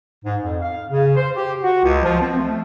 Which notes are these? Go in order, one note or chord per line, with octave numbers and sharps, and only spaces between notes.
G#2
F2
F5
C#3
C5
G4
F#4
C#2
F3
C4
A3